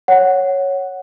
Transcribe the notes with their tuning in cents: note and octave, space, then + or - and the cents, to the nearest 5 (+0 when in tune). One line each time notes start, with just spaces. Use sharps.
C#5 +0 F#5 +0